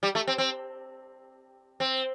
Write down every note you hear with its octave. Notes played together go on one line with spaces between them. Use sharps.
G3
A3
C4
C4
C4